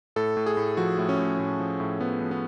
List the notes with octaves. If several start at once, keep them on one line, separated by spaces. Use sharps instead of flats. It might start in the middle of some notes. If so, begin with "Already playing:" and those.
A2 A4
A2
G#4
A2
F3 F#4
A2
C#4
A2
A2
F3
A2
F3 B3
F3
B3